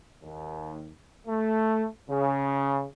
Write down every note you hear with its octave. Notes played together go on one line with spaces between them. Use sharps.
D#2
A3
C#3